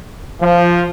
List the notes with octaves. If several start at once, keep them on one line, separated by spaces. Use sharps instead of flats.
F3